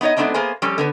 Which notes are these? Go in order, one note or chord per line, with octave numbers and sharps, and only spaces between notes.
B3 D#4 C5 C#5 D#5
G#3 A3 B3 C4 D4 D#4
A#3 B3 G#4 C5 G#5
F3 G3 C#4 G4 A4
D3 B3 B4